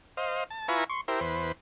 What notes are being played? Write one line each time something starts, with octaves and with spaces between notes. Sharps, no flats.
C5 D#5 F5
A5
E4 F4 B4 G#5 A#5 C#6
C6 C#6
E4 G4 A#4 C5
E2 B4 C5